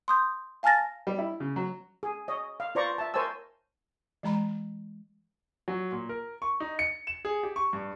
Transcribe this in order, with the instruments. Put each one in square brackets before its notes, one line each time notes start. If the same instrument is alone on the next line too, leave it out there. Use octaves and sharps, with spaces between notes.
[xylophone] C6 D#6 G6
F5 G#5 A5 F6 A6 A#6
[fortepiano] G3
E4
C#3
F#3
[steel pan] G#4
C#5 D#5
F5
F4 B4 C5 D5 A#5 C#6
E5 A5
A#4 C5 C#5 G#5 A5 E6
[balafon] E3 G#3 A#5 B5
[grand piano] F#3
A#2
A#4
C#6
D#4
C#7
E7
G#4
G4
C#6
G2